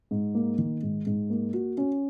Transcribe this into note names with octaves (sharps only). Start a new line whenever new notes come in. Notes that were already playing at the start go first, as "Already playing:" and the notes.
G#2
A#3
D#3
G#2
G#2
A#3
F#4
C#4